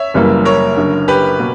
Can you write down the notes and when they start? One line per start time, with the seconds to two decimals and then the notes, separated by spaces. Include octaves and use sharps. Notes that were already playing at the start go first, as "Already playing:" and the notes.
Already playing: C#5 E5
0.14 F#1 F#2 E3 G3 A#3
0.45 A#4 C#5
0.77 F#1 F#2 D3
1.08 G4 B4
1.39 B2 A#3